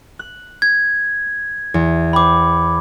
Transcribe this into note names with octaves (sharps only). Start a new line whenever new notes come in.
F#6
G#6
E2
C5 G5 B5 D6